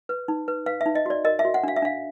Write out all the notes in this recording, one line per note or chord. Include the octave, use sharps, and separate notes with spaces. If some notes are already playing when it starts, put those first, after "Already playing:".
B4
D#4
B4
B4 F5
E5
D#4
D#5
F#4 D5
A#4 D#5
E5
F#4
F#5
D4 F5
E5
D4 F5